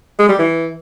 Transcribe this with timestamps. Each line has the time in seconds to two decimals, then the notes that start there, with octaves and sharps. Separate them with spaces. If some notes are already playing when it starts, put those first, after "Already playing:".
0.19 G#3
0.29 G3
0.38 E3